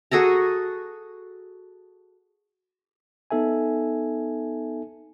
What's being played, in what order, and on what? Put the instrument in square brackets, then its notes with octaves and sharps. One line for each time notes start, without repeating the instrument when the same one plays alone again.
[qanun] F#4 G#4 A4 A#5
[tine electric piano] B3 D#4 A4 E5 G#5